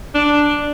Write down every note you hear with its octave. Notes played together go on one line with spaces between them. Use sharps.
D4